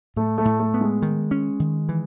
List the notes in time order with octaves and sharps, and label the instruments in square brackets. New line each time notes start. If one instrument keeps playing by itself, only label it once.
[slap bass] A2 [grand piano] A3
[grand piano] A3
[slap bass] A2
[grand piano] A3
[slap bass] B3
[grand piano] G#3
[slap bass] D#3
C#4
D#3
E3